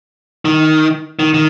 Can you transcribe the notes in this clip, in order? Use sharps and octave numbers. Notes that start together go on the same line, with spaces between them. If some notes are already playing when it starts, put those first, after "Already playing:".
D#3
D#3
D#3